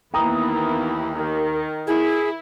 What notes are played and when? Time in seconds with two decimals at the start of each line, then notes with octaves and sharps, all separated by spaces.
0.14 D#2 E3 A#3 B3 G5 A#5 D#6
1.15 D#3
1.87 E4 G#4